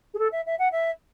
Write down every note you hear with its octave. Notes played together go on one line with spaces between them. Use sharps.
G#4
A4
E5
E5
F#5
E5